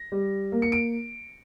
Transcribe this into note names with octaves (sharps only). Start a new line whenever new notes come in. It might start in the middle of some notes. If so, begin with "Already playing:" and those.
Already playing: A#6
G3
A#3
C#7
D7